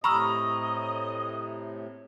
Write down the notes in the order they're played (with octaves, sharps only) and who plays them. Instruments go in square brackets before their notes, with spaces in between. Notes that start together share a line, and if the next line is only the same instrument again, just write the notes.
[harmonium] A2 C3 [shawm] D#5 [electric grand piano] A#5 F6 [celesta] B5 C#6 E6